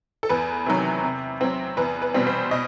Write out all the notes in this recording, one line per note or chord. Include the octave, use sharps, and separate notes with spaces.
A4
E2 B4
C3 D#3 F#3
C3
F#3 C4
E2 B4
B4
B2 G3 C4
C5
B2 D#5